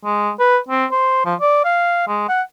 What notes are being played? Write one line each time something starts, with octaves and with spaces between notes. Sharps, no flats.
G#3
B4
C4
C5
F3
D5
F5
G#3
F#5